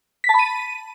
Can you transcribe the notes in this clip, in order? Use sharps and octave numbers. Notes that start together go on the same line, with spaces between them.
B6
A5
B5
D#7